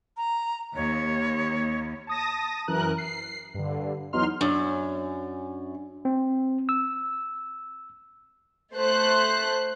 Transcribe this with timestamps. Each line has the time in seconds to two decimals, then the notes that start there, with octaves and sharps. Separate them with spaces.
0.17 A#5
0.75 D#2 C#5
2.07 A5 D#6 A#6
2.68 F#2 E3 A#4 F#6
2.98 C7
3.54 G2 D3
4.13 E2 F#3 B3 D#4 C6 F6
4.41 F#2 D4
6.05 C4
6.69 E6
8.75 A3 C5 F#6